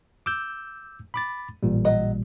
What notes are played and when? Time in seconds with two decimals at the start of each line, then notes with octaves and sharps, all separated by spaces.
0.26 D6 E6 G6
1.14 B5 D6 A6
1.63 A1 A#2 G3
1.85 F#3 D#5